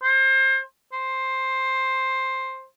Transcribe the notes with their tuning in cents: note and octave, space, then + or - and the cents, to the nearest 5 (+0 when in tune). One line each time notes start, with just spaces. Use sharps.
C5 +30
C5 +10